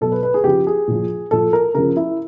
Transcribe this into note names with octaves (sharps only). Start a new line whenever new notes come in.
B2 F#3 A4
B4
B4
G#4
C#3 F3 G4
G#4
A#2 F3
A#2 F3 A4
A#4
C#3 F3 A#4
E4